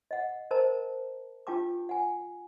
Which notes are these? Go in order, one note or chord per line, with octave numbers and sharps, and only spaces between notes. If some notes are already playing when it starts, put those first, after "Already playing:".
D#5 F#5
A#4 C5 D#5 A5 A#5
D4 F4 G4 G5 A5 D6
F#5 G#5